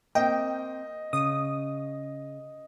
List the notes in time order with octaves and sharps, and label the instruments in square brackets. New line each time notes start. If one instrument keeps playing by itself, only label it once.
[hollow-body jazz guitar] A#3 C4 [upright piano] D#5 [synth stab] G5
[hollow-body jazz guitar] C#3 [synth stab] D#6